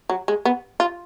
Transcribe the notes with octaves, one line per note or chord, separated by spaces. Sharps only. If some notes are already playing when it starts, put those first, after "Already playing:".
F#3
G#3
B3
F4